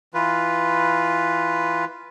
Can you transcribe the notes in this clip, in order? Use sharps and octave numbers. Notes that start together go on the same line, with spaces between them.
E3 F4 B4